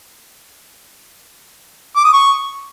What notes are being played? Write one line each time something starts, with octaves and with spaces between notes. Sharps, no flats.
D6
D#6
C#6